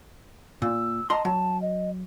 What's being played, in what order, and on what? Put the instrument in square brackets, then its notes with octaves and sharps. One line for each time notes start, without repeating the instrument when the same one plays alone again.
[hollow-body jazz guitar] A#2 [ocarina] E6
[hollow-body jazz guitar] D#5 A#5 C6 [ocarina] A5
[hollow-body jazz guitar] F#3 [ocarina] A5
[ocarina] D#5